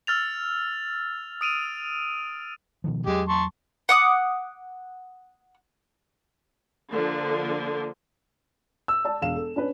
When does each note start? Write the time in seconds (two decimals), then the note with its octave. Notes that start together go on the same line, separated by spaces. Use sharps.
0.07 E6 F6 A6 F7
1.41 D#6 D7 D#7 F7
2.84 B2 D#3 F3
3.06 E2 F#3 G#3 G4
3.28 A5 C6 C#6
3.89 F#5 D6 D#6
6.90 D3 F3 A#3
8.88 E6
9.05 D5 A5
9.22 E1 F5 E7
9.36 A4
9.56 C#4 D4 B4